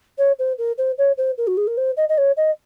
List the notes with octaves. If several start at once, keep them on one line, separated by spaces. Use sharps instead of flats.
C#5
C5
A#4
C5
C#5
C5
A#4
F#4
G#4
A#4
C5
D#5
D#5
C#5
D#5